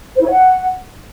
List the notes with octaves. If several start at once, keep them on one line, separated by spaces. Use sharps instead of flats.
C5
E4
C#5
F#5